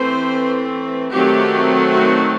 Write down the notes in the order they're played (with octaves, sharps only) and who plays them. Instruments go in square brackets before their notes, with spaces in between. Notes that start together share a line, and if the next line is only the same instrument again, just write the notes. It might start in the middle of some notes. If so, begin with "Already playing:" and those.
Already playing: [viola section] E3 A3 C4 C5
D#3 F#3 A3 C4 G4
F#4